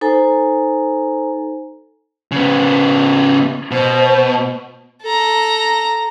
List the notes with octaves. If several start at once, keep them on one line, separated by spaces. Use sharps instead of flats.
D#4 A4 C5 G#5 A#5
C#3 B3
B2 C5
A4 A#5